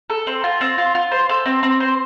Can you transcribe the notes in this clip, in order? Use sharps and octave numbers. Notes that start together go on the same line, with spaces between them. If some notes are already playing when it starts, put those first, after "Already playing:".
A4
C4
F4
C4
F4
F4
C5
A4
C4
C4
C5